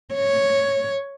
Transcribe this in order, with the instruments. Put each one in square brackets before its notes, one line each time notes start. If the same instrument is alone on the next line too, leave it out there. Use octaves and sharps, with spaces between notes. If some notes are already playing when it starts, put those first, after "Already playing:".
[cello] C#5